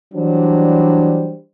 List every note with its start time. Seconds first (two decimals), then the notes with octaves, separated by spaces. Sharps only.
0.14 E3 F#3 G3 D4 C5